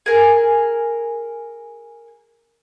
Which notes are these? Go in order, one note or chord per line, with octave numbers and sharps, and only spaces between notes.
G#4 A#4